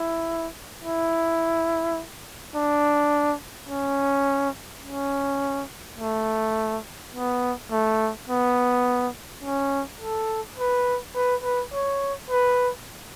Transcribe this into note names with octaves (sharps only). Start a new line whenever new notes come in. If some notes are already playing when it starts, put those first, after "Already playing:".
Already playing: E4
E4
D4
C#4
C#4
A3
B3
A3
B3
C#4
A4
B4
B4
B4
C#5
B4